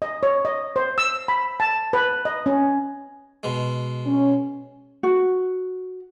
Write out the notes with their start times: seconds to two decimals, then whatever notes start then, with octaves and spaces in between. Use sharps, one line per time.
0.02 D#5
0.23 C#5
0.45 D#5
0.76 C5
0.98 E6
1.28 B5
1.60 A5
1.93 B4
2.25 D#5
2.46 C#4
3.43 B2 G#3
4.06 C#4
5.03 F#4